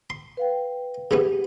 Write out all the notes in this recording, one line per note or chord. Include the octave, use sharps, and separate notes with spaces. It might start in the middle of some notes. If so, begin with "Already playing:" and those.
C6
B4 F5 G5
C#3 E3 B3 G4